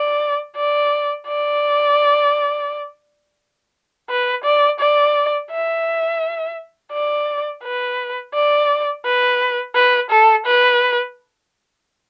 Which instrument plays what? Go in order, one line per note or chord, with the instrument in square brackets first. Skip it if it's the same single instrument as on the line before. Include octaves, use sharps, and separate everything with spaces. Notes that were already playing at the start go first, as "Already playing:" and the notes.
Already playing: [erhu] D5
D5
D5
B4
D5
D5
E5
D5
B4
D5
B4
B4
A4
B4